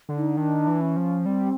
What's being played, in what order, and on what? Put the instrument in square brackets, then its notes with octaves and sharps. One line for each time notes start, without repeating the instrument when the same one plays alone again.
[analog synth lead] D3
[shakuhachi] D#4
[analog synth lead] D#3 [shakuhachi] D4
[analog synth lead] E3
[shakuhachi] C#4
[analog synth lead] F3
[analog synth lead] G3 [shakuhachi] C4